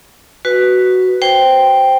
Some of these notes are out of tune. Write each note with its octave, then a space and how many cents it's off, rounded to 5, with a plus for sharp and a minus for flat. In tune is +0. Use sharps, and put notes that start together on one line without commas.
F#4 +5 B4 +0
C5 +0 G5 +0